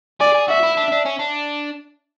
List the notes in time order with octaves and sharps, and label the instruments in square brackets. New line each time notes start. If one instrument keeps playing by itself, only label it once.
[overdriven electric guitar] G#4 [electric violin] D5
[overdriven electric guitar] G#4
[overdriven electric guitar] F#4 [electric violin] E5
[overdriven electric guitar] E4
D4
D4
C#4
D4